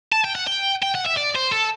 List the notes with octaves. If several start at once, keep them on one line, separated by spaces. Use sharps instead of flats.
A5
G5
F#5
G5
G5
F#5
E5
D5
C5
A4